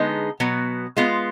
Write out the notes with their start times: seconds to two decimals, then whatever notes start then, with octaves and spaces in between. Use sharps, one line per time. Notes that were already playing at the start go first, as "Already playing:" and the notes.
Already playing: D3 G#3 B3 D#4 G#4
0.40 B2 F#3 B3
0.97 G#3 B3 F4